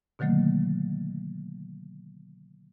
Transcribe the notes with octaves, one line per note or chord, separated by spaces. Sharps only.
B2 D3 D#3 F#3 A3 A#3